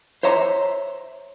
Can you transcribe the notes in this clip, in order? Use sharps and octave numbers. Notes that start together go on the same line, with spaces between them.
C5 C#5 E5 A#5 C6